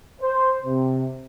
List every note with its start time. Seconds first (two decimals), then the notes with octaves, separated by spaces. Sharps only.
0.21 C5
0.65 C3